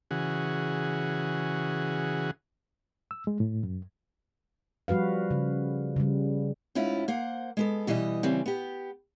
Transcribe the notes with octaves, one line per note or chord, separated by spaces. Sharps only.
C#3 E3 F#4 G#4
E6
G#3
A2
F#2
F3 G3 F#4 B4 F5
C#3
C#3 G3
G#2 C#4 E4 F4
A#3 C5 F#5
G#3 B3 A4
B2 E3 G3 C#5 D#5
C#3 E3 G3 C4
B3 G4